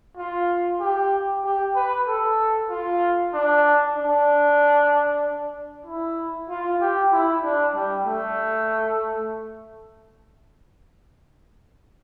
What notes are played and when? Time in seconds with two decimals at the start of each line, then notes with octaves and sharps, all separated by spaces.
0.17 F4
0.80 G4
1.44 G4
1.75 B4
2.07 A4
2.70 F4
3.34 D4
3.96 D4
5.86 E4
6.49 F4
6.81 G4
7.12 E4
7.44 D4
7.75 G3
8.06 A3